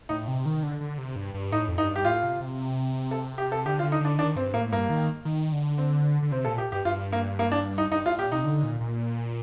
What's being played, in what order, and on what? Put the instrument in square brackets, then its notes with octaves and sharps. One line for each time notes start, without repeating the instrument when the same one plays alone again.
[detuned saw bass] A2 [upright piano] D#4
[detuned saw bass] C3
D#3
D3
D3
C3
G2
G2
[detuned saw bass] A2 [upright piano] D#4
[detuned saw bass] F2
[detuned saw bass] G2 [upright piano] D#4
[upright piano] G4
[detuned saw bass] A2 [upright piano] F4
[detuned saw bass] C3
C3
[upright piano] A4
G4
A4
[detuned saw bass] D3 [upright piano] G4
[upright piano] F4
[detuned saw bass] D3
[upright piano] D#4
[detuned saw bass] D3 [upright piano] D4
[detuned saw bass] D#3 [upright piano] D4
[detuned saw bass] G2 [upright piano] C4
[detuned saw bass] A2 [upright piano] A#3
[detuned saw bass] G2 [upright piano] A#3
[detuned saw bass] D#3
D#3
D3
[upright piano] C4
[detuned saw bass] D3
[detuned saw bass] C3 [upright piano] C4
[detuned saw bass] A#2 [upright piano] A4
[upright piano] G4
[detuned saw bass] G2 [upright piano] G4
[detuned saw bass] G2 [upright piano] F4
[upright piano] A#3
A#3
D4
D#4
[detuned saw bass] G2 [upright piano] D#4
[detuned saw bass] A2 [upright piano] F4
[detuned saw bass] A#2 [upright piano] G4
[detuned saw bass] C3 [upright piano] D#4
[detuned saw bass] D3
A#2
A#2